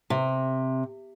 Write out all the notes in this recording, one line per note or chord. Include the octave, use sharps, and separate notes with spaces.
C3